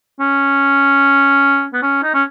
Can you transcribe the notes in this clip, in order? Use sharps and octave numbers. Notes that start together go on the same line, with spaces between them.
C#4
B3
C#4
D#4
C#4